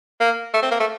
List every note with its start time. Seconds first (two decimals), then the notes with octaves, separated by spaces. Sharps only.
0.20 A#3
0.54 A3
0.63 C4
0.71 A#3
0.80 A3